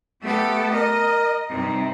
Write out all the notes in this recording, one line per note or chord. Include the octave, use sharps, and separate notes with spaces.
A3 B3 G4 A4
A#4 D#5
G2 C3 D#4